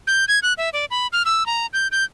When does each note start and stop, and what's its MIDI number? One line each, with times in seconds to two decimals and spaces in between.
0.07 0.25 91
0.28 0.39 92
0.43 0.53 90
0.58 0.69 76
0.73 0.85 74
0.91 1.07 83
1.12 1.23 89
1.25 1.46 88
1.46 1.66 82
1.73 1.88 91
1.92 2.04 91